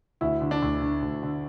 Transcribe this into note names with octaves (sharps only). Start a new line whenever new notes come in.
D2 E4
D3
D4
D2
D3
D2
D3